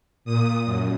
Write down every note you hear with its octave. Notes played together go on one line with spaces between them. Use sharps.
A#2 D#6
F#2